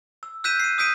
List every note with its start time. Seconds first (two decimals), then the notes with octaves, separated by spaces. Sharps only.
0.23 E6
0.44 E6 F#6 G6 B6 D#7 E7
0.60 C7 D#7
0.78 D#6 E6 G6 B6 D7 D#7